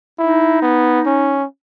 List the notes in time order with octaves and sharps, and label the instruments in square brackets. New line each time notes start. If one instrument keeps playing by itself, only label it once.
[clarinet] D#4 [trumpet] E4
[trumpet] B3
C#4